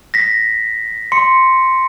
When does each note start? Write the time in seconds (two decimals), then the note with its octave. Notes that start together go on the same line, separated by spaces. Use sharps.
0.14 A#6 B6
1.12 C6 C#7